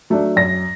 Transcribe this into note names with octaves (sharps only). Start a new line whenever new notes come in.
F#3 A3 D4
F#2 A#6